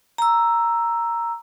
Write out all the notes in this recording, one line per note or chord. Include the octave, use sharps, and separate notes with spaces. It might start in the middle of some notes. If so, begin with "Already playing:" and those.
A#5 E6